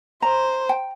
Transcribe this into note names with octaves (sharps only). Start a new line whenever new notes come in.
C5 A#5
G5